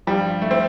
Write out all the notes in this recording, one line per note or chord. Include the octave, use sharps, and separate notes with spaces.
G2 F3 G3
A3
C4